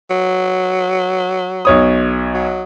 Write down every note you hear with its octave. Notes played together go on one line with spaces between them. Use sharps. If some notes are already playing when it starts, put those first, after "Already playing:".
F#3
B1 C#5 D#6
F#3